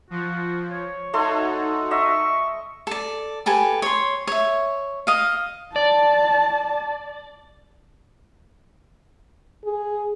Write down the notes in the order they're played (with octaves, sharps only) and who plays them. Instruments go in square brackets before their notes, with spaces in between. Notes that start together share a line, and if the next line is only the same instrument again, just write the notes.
[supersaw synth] F3 [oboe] F#4
[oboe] C#5
[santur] A3 A4 C6 [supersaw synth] D#4 F#4
[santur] D#5 E5 [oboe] C#6
[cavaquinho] A4 D5
G4 A4 B4 G#5
C#5 C6
C#5 E5
D#5 F5
[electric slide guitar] D5 [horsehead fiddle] A5
[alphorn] G#4